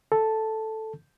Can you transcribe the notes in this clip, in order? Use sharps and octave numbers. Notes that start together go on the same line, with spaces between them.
A4 A5